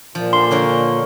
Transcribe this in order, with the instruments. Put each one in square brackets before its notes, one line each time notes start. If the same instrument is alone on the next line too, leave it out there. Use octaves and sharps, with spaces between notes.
[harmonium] A#2 [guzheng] F3
[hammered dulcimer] D3 A#3 [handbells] C6
[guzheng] D3 F3 A#3 [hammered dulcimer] C#5 C#6